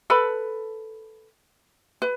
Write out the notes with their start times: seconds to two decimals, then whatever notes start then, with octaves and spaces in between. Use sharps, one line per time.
0.10 A4 B4 B5
2.02 B4